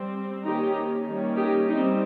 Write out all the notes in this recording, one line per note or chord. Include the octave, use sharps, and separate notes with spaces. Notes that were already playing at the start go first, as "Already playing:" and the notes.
Already playing: G3 C4
D#3 A#3 C#4 D#4 G4
D#3 G3 A#3 C#4
D#4 G4
G3 C4 D#4